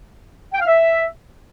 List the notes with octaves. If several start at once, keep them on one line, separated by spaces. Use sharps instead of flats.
G5
F5
E5